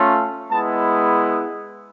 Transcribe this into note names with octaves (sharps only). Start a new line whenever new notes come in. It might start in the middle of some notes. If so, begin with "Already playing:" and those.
Already playing: A3 C#4 F4
G#3 B3 E4 A5